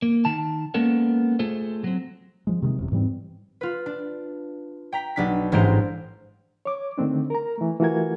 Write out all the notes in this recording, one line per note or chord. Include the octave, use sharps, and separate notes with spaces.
A#3
D#3 A5
G#3 A#3 B3 C#4 A4 A#4
A3 F4 G#4 A4 C5
F#3 C4
F3 G#3
C3 D#3 F#3 G#3
F#1 E2 C3
G#2 E3 G3 C4
F4 B4
D4
G5 A#5 B6
B1 D4 B6
A1 G#2 G#3 C5 A#5 D7
C#5 D6
D3 D#3 A3 C4 D4
A#4 A#5
E3 A3
E3 A3 F4 F#4 A#4 G#6